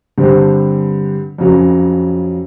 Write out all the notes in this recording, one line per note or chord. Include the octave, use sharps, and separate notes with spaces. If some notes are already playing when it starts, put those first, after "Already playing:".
G2 D3 G3 C4
F2 C#3 F#3